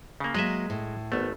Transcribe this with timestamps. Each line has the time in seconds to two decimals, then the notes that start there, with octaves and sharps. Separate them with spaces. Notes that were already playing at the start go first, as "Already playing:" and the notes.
0.20 C#3 A#3
0.35 F#3 G#3 A#3 D#5 E5
0.70 A2
1.12 G#1 A3 B3